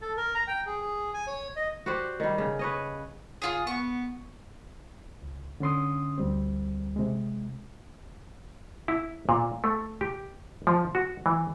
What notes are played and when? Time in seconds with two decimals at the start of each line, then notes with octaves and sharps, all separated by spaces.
0.01 A4
0.17 A#4
0.35 A#5
0.47 G5
0.66 G#4
0.81 G#4
1.14 G#5
1.27 C#5
1.56 D#5
1.86 F#4 G4 C5 D5
2.20 D#3 G3
2.38 C#3
2.59 B4 C#5 D#5
3.42 C#3 F4 G#4 C#5
3.67 B3 C#6
5.22 C#2
5.60 D3 C#4 C6 D#6
6.18 D2 G3 C4
6.96 C3 G#3
8.88 E4
9.29 A#2
9.64 A3
10.01 G4
10.67 F3
10.95 F#4
11.26 E3